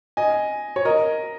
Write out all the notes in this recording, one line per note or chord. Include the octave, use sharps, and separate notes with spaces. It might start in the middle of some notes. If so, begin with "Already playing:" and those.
D#5 G#5
C#5
A#4 D#5